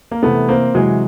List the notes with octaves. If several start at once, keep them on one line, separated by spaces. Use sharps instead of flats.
A#3
C3 E3 A3 B3
A#3 C4
C3 E3 F#3 G#3